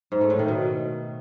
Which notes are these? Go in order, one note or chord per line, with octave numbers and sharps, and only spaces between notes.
G#2
A3
A2
D#3
B2